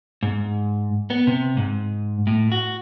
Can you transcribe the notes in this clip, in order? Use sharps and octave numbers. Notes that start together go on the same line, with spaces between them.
G#2
B3
C3
G#2
A2
F#4